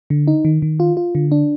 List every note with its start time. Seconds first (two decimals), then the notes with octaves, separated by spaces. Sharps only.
0.10 D3
0.28 D#4
0.45 D#3
0.62 D#3
0.80 F4
0.97 F4
1.15 D3
1.32 D4